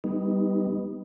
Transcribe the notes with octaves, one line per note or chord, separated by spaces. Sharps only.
G3 B3 D#4